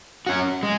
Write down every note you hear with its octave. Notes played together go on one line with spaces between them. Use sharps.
C#4 F#4
G#3